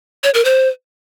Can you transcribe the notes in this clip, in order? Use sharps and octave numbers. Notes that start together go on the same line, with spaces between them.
C#5
A#4
C5